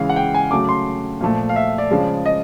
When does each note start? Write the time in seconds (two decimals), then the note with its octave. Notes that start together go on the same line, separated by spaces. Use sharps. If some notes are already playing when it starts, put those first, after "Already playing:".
Already playing: C#3 E3 G#3 F5
0.09 F#5
0.16 G5
0.34 G#5
0.51 C#3 F#3 A3 D6
0.69 C6
1.21 A#2 F3 A3
1.49 F5
1.56 E5
1.78 D5
1.91 C#3 F3 G#3
2.26 D#5